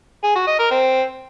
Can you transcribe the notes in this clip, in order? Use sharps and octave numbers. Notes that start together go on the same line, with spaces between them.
G#4
F#4
D#5
A#4
C4